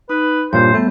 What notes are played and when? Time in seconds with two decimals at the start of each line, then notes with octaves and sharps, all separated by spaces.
0.09 D#4 B4
0.53 G2 A#2 C5 C#5
0.74 G3 A3 B3